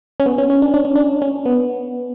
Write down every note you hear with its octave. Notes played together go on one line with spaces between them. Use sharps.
C#4
B3
C#4
C#4
D4
D4
C#4
D4
C#4
B3